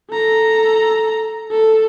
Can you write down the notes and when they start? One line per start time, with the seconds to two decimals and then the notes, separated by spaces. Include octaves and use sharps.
0.11 A4 A#5
1.51 A4